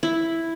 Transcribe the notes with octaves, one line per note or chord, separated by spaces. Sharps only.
E4